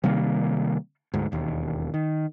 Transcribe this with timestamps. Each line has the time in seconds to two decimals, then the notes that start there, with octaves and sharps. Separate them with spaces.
0.04 C3 D#3 G3 A#3
1.14 D2 G#2
1.32 E1 D#2
1.94 D#3